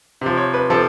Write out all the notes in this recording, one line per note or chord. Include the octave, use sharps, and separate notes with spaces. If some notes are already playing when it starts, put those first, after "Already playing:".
C3 F3
C#5
B4
C3 F3 A4